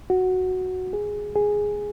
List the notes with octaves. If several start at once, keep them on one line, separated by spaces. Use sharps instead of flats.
F#4
G#4
G#4